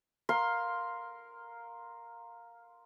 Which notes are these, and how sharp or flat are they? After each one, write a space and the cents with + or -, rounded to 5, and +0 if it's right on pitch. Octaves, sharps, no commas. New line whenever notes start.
A#4 +0 F5 +10 C6 +0